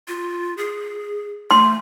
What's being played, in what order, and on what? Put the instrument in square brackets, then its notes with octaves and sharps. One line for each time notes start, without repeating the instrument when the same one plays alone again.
[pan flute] F4
G#4
[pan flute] A3 [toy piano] C6